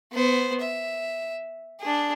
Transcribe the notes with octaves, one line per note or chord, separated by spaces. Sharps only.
B3 C5
E5
D4 G#4